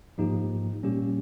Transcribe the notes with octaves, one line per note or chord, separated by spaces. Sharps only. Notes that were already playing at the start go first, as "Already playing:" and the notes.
G#2 F3 A#3 D#4 G4
A#2 G3 A#3 C#4 G4